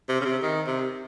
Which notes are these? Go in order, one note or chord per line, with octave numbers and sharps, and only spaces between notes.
C3
C#3
C3
D#3
C3